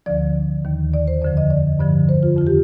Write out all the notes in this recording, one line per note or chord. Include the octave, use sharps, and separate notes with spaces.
D2 D3 F3 D5
D#2 D#3
D5
C5
F2 D3 F3 D5
D#5
D5
G2 D3 F3 D5
C5
F4
F2 D#3 F4
G4